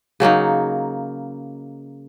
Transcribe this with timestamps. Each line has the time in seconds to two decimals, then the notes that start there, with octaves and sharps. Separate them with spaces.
0.20 C#3 F#3 A#3 D#4